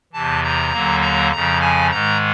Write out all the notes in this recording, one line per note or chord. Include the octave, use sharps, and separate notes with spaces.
E2 C3 E3 A5
A#5
D#2 D3 F#3 A#3
A#5
F2 C#3 F3 A#5
G#5
G#2 D#3 G#3 A#5